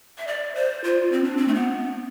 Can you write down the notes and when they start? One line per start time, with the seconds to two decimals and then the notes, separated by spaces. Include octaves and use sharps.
0.18 E5
0.27 D5
0.55 C5
0.84 F4
1.12 C4
1.24 D4
1.37 C4
1.48 A3
1.54 B3